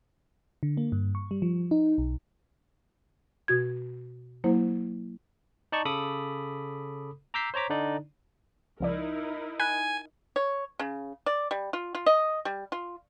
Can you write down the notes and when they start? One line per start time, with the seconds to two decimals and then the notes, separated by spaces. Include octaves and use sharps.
0.63 D3
0.77 A#3
0.92 G2
1.15 C#6
1.31 G3
1.42 F3
1.71 D#4
1.98 B1
3.48 B2 F#4 G#6
4.44 F#3 A#3 E4 C5
5.72 D#4 D5 A5 C#6
5.85 C#3 A4 B5 D6 D#6 B6
7.34 A#5 D6 E6 G6 B6 C7
7.54 C5 C#5 A#5 D6 B6
7.70 D3 D4 D#4 D5
8.80 C#2 F3 D#4 E4 A#4 D5
9.60 G#5 B5 F#6
10.36 C#5
10.79 C#3
11.26 D5
11.51 G3
11.73 F4
11.95 F4
12.06 D#5
12.45 G3
12.72 F4